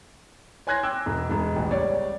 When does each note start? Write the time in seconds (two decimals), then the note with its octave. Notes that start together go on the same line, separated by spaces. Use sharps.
0.67 C#5 G#5 C6 F#6 G#6 A#6
0.83 G5 D6 E6
1.06 E1
1.29 E1 G#3
1.56 A1 E2
1.71 C#2 G3 C#5 D5